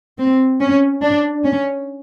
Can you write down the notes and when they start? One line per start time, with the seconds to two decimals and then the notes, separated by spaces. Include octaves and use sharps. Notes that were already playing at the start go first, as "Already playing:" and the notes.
0.19 C4
0.60 C#4
1.02 D4
1.44 C#4